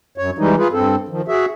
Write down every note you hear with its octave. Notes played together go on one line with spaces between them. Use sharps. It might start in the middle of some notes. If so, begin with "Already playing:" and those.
F#2 C#5
E3 G3 G#3 D#4
F4 G#4 B4
G2 C4 A4
D#3 F3
F#4 G#4 E5